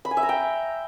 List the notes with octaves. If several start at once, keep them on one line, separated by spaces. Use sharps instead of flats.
B5
G#5
E5
A#5
G5